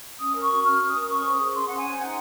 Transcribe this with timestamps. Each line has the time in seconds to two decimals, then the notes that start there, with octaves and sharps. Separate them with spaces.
0.19 C#4 D#6
0.34 A#4
0.41 C#6
0.49 F#4
0.65 C#4 F6
0.79 C#4
0.87 D#6
0.94 A#4
1.00 D#6
1.09 C#4 C#6
1.24 C5
1.31 D#6
1.39 G#4
1.54 C#4 C6
1.68 C#4 F#5
1.76 G#5
1.85 C5
1.99 D#4 F#5